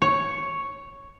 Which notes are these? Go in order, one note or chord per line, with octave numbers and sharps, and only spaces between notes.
C#5